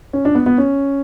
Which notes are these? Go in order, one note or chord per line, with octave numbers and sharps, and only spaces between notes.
C#4
D4
B3
B3
C#4